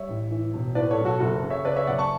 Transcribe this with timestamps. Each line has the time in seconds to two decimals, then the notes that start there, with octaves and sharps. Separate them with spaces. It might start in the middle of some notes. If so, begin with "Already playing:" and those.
Already playing: G3 C#5 E5
0.08 A1
0.31 E3
0.53 E1
0.75 A2 B4 D5
0.90 A4 C#5
0.98 B1
1.05 F#4 A4
1.20 F#1 F#4 A4
1.43 C#3
1.50 C#5 E5
1.65 C#3 B4 D5
1.76 C#5 E5
1.87 F#1 D5 F#5
1.98 A5 C#6